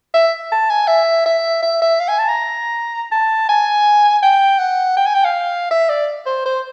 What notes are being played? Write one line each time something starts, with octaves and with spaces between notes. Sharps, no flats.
E5
A5
G#5
E5
E5
E5
E5
F5
G#5
A5
A#5
A5
G#5
G5
F#5
G5
G#5
G5
F5
E5
D5
C5
C5